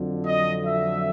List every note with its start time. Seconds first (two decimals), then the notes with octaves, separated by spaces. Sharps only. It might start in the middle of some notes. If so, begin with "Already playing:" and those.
Already playing: F2 D3 F#3
0.26 D#5
0.64 E5